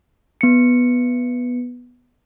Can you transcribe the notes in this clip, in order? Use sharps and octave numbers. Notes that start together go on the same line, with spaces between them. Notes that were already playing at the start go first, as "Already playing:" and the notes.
B3 C#7